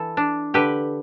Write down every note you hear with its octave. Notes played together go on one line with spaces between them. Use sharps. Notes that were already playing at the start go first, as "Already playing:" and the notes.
Already playing: E3 A4
D4
D3 G4 B4